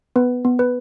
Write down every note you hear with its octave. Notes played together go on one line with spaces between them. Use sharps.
B3 B4
B3
B4